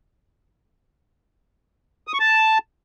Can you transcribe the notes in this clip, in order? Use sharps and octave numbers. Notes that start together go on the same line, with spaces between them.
D#6
C#6
A5